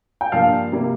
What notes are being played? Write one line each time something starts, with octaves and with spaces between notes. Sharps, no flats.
G5
G2 F3 A#3 F5 A5
C3 G3 A#3